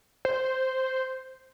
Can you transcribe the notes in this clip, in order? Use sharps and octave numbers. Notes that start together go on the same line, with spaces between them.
C5